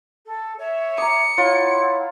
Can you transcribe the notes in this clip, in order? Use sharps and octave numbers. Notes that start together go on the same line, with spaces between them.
A4
C#5 E5
A#5 D6 D#6 C#7
E4 F4 C#5 F#5